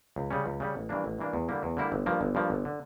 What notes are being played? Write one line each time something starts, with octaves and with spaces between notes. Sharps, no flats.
C#2
C#3 G3 C#4
C#2
C#3 G3 C#4
A1
G2 E3 A#3 D4
A1
G2 E3 A#3 D4
E2
D3 G3 A#3 E4
E2
D3 G3 A#3 E4
G1
G2 F3 A#3
G1
G2 F3 A#3
G1
D3